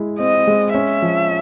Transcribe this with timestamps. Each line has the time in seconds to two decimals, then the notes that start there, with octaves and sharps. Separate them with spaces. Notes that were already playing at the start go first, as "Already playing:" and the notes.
Already playing: G#3 E4
0.20 C4 D#5
0.47 G#3
0.74 C#4 E5
1.02 F3